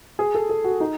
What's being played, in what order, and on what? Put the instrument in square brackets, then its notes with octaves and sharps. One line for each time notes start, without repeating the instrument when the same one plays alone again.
[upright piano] G#4
A4
A4
F#4
D#4